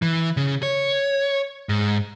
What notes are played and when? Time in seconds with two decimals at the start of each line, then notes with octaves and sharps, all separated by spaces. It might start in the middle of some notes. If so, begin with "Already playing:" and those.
0.02 E3
0.37 C#3
0.63 C#5
1.69 G#2